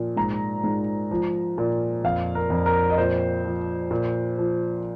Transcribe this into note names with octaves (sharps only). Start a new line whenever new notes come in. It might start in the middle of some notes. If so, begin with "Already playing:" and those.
Already playing: A#2 F3
G#2 A#5
G#2
F3
A#2
F2 F5
A#4
F2
A#4
D#5
A#2 C5
F3
A#2
F3